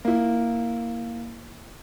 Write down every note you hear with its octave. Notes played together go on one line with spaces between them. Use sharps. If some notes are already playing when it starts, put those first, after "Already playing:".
A#3 E4